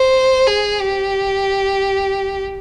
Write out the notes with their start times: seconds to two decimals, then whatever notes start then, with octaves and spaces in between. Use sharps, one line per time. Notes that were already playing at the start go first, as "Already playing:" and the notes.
Already playing: C5
0.47 G#4
0.80 G4